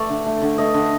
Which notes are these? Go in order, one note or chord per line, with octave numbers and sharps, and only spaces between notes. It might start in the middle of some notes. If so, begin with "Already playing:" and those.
Already playing: A3 D5
D3
A3
D3
A3 D#5
D3